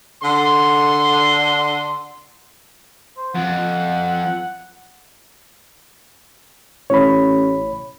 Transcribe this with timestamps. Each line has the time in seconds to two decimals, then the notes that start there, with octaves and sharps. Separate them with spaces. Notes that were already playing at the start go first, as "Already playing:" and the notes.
0.23 D3 C6
3.17 C5
3.35 F2 F#5
6.90 A1 C#5 B5